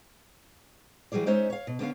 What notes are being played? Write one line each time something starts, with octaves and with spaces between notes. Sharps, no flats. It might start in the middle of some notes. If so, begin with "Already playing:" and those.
E3 F#3 G3 G#4 D5
G#3 C#4 D#4 C5 C#5 E5
C#5 F5
B2
D3 B3 C#4 F5